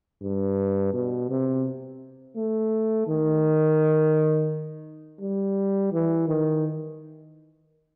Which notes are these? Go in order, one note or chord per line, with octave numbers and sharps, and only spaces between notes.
G2
B2
C3
A3
D#3
G3
E3
D#3